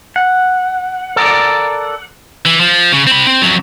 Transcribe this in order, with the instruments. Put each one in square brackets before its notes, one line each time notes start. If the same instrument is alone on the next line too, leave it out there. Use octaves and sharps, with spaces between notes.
[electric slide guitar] F#5
[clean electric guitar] A4 A#4 D5
[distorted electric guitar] E3
F3
C#3
C4 B5
C4
F2 F#3